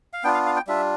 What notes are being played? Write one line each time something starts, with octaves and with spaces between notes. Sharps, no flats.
F5
B3 D4 F4 G5
F5
F5
G5
G3 D4 F4 E5